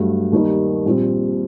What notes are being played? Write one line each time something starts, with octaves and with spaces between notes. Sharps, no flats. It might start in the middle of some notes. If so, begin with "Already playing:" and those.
Already playing: G2 F#3 A3
D#2 D#3 G3 A#3 D#4
A#1 A#2 G3 C4